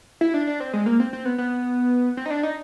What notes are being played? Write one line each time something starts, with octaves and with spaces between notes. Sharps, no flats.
E4
D4
D4
C4
G#3
A#3
C4
C4
B3
B3
C4
D#4
D4
D#4